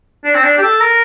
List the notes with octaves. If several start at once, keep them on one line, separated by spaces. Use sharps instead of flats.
D4
C4
D4
G4
A4
A#4